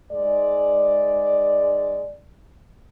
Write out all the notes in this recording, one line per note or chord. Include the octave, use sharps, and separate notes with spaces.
G#2 G#3 D5